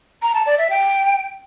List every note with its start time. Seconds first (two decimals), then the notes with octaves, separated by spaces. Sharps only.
0.22 A#5
0.34 A5
0.46 D5
0.58 E5
0.70 G5